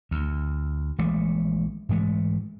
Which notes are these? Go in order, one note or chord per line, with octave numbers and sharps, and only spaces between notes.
D2
A#1 E3 G#3 A3
G#2 E3 G#3 A3